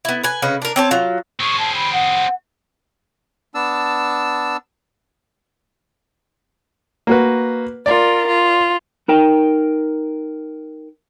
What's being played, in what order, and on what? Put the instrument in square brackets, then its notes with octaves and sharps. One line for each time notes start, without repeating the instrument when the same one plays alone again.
[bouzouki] B3 E4
B4 G#5
C#3 C#4 B4 D#5
D4 A#4
C4 C#5 A5
F#3 F4
[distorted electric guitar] C4 G#4 [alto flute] C#6
[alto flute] A5
B5
F#5
[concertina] B3 D4 A5 E6
[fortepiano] A#3 F#4 B4
[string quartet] F4 A#4 [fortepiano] D5
[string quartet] F4
[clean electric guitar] D#4 A#4 G5